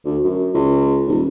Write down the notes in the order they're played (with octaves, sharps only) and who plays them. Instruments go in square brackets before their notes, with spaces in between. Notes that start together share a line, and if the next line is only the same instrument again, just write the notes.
[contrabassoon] D2
F#2
C#2
D#1